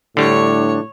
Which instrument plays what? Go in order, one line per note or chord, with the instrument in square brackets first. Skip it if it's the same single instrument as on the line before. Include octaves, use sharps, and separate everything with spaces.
[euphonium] A2 [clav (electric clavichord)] D3 G3 [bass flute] D4 [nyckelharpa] C#5 C#6